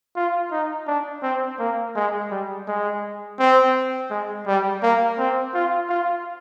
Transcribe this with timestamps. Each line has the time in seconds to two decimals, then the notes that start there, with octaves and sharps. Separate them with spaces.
0.16 F4
0.51 D#4
0.87 D4
1.23 C4
1.59 A#3
1.96 G#3
2.31 G3
2.68 G#3
3.39 C4
4.10 G#3
4.46 G3
4.83 A#3
5.19 C4
5.54 F4
5.89 F4